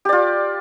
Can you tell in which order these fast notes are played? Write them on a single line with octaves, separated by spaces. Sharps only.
G4 D5 F4